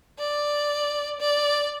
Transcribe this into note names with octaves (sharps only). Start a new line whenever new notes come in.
D5
D5